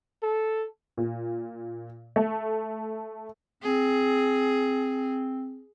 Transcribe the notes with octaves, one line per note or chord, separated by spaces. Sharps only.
A4
A#2
A3
C4 G#4